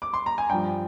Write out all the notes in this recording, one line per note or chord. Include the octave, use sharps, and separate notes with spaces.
D6
C6
A#5
G#5
G2 F3 G5